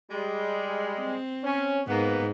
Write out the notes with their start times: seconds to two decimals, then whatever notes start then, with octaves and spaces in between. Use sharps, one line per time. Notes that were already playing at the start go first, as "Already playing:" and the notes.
0.10 G3 G#3
0.99 C4
1.43 C#4
1.87 G#2 A#3 B3